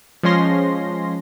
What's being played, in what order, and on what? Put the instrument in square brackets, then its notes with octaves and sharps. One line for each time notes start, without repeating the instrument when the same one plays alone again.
[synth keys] F3 G#3 C#4 C6 A#6